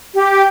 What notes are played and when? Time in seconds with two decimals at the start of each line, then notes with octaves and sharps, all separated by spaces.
0.14 G4